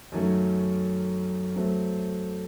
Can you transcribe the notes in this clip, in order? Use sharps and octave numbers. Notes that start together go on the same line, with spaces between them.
F#2 D#3 F#3 A3 C#4
F#3 A3 C4